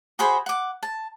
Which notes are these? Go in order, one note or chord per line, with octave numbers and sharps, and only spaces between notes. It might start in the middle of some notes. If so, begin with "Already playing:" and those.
F#4 G#4 C5 B5
F#5 D6
A5